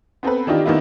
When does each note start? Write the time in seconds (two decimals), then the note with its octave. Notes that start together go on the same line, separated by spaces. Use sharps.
0.23 B3 C4 A4 B4
0.47 D#3 E3 D4 D#4 F4 G4
0.66 D#3 A#3 B3 D#4 E4